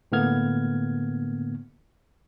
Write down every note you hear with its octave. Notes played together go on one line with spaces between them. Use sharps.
A2 D3 A#3 B3 F6 G#6